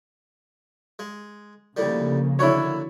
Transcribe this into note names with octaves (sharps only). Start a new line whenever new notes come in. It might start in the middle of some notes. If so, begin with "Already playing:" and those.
G#3
D2 A2 C#3 F3 G3 A#3
D3 F#3 E4 F#4 C#5